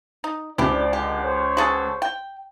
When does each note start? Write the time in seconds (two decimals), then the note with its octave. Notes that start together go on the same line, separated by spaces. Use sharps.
0.24 D#4
0.58 C#2 D4 E4 G4 C5 D5
0.93 D3 G#3 G4
1.23 C5 C#5
1.57 F#4 G#4 A4
2.02 G5